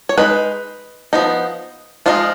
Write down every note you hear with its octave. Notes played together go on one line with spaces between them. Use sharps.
C#5
G#3 D#4 B4
F3 B3 D#4
F3 G#3 B3 D#4 F4